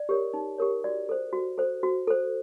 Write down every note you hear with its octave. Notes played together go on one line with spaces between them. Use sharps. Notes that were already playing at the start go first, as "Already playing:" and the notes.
Already playing: D5
G4 A#4 C#5
D#4
G4 A#4 C#5
F#4 D5
A4 C5
F#4
A4 C5
F#4
A4 C5